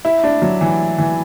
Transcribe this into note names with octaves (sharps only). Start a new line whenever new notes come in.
E4
D4
F#3
E3
E3